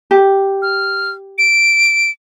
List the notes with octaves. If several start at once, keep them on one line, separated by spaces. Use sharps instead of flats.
G4
F6
D7